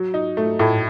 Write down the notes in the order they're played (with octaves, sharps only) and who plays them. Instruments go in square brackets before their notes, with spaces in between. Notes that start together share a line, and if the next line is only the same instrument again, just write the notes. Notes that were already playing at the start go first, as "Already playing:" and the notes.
Already playing: [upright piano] F#3
D#4
A3
A2